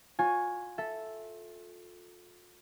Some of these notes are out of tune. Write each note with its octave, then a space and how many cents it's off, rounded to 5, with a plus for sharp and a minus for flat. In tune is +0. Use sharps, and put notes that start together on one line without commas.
F4 +35 C#5 +0 G#5 +0
A4 +0 E5 +0